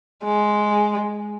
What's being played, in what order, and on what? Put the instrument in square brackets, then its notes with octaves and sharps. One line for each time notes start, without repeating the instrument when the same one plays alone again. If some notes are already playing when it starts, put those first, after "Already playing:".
[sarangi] G#3